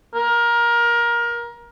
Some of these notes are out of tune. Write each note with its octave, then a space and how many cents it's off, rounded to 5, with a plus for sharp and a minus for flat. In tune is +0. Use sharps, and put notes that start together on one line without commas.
A#4 +20